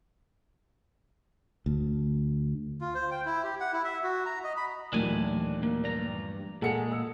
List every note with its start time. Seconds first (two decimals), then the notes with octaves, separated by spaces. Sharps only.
1.66 D2
2.81 F4
2.95 C5
3.11 G5
3.25 E4
3.44 G4
3.60 F#5
3.73 E4
3.84 E5
4.03 F#4
4.26 A#5
4.44 D#5
4.57 B5
4.93 D#2 A#2 E3 F#3 A3 D4 G#5
5.63 A#3
5.84 G2 D5 A#5
6.62 A#2 G#3 G#4 A4 F#5 C#7
6.92 E6